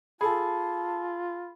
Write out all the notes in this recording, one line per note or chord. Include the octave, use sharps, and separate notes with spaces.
F4 G#4 A4 A5 B5